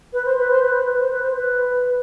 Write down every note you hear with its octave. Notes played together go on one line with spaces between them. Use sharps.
B4
C5
B4
C5
B4
C5
B4
C5
B4
C5
B4